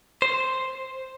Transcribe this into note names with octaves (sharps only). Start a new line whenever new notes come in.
C5